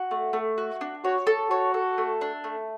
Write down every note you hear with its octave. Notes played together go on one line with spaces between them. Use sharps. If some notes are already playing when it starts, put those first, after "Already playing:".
Already playing: F#4
A3
A3
F#4
D4
F#4 C#5
A4
F#4 C#5
A4
A3
D4
A3